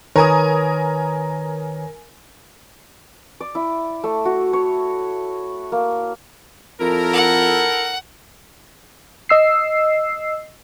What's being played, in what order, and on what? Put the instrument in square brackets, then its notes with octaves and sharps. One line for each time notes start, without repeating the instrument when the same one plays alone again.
[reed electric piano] D#3 B4 C#5 [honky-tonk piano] A#4 G#5 D#6
[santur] D5
E4
A3
F#4
C#5
A#3
[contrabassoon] F2 [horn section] E4 A4 A#4
[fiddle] F#5
[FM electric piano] D#5 E6 C7